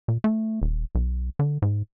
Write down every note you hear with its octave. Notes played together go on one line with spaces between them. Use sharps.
A#2
A3
D#1
B1
D3
G#2